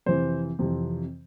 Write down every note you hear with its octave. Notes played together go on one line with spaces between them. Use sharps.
F2 C3 E3 C5
F2 C3 E3